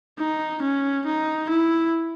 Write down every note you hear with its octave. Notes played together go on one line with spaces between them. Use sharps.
D#4
C#4
D#4
E4